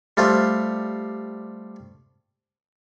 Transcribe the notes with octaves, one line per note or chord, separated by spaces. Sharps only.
G3 A3 F4 C5